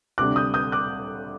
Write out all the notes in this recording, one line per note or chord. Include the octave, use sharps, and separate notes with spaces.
D2 C3 G3 D4 D6 F#6
D#6 G6
D#6 G6
D6 F#6